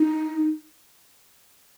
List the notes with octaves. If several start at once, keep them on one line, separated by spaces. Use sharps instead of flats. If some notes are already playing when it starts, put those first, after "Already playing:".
Already playing: D#4